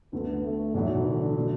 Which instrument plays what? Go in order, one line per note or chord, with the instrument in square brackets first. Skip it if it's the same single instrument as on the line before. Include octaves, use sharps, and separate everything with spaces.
[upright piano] D2 D3 A3 [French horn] B3
[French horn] A3
[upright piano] B1 A2 E3 D4 F#4 [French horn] F#3
[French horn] D3
[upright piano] B2 F#3 A3 D4